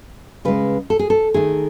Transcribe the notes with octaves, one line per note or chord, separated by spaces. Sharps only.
C#3 G#3 B4
A4
G#4
A4
D#3 A3 G#4